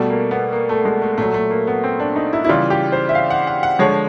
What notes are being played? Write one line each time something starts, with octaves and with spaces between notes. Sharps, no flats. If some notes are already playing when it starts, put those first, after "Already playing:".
Already playing: B2 G3 A3
A#3
B3
A#3
A3
G#3
A3
A#2 F#3 A3
A3
A#3
B3
C4
D4
D#4
E4
E4
C#3 E3 G3 F4
G4
C5
E5
F5
F#5
F#5
F#5
D3 F3 G#3 C#5